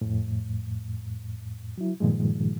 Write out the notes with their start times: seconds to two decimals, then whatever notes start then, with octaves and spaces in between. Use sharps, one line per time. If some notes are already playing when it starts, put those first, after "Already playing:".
0.01 F2 A2
1.78 F#3 E4
2.00 G2 A#2 D#3 F3 G#3